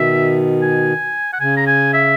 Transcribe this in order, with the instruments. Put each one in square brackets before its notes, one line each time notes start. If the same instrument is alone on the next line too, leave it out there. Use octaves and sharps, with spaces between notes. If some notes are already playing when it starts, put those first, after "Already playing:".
Already playing: [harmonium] B2 D#3 [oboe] E5
[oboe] G#5
F#5
[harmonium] C#3 [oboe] G#5
[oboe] A#5
G#5
E5